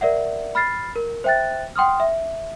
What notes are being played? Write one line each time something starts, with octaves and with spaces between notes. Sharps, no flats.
A#4 D5 E5 F#5
B5 F6 A6 C7
A#4
C5 E5 G5 F#6 A6
F#5 G5 C6 D#6 F6
E5